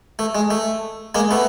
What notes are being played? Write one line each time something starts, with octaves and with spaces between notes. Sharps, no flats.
A3
G#3
A3
G#3 A#3
A3 B3